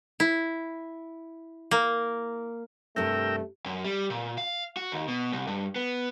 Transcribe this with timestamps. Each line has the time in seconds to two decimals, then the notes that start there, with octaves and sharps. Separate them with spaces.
0.20 E4
1.71 A#3
2.96 G2 C3 A3 A#4 G5 E6
3.66 F#2
3.85 G3
4.10 A#2
4.38 F5
4.77 F#4
4.92 D#2
5.08 B2
5.32 C2
5.47 G2
5.76 B3